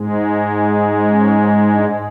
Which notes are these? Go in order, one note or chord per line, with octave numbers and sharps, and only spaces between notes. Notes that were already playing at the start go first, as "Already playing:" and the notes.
Already playing: G#2 G#3
C#4
D4